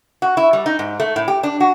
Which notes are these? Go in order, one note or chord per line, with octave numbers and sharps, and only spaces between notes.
F#4
E4
G3
D#4
G#2
A3
A2
G4
D4
F#4